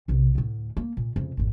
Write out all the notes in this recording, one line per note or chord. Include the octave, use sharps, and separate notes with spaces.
B1 C3
D2 A2
A#3
A#2
F2 C#3
G#1 F2